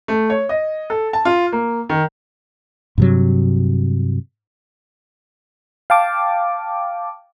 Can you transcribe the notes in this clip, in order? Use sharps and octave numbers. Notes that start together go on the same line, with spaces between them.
A3
C#5
D#5
A4
A5
F4
A#3
D#3
G2 C3 F#3
F5 G5 A5 D6